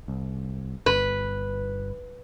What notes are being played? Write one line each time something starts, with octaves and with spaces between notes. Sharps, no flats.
C2
G1 B4